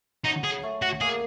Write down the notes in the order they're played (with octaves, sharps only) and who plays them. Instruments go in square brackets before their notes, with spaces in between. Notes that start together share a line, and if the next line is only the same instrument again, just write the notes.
[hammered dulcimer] F#3 [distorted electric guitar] D#4
[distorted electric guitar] G#4
[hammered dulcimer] A3
[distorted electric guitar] F#4
[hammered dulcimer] A#3 [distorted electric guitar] G#4